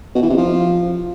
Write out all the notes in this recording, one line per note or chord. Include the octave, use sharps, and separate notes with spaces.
B2
E3
C3
F3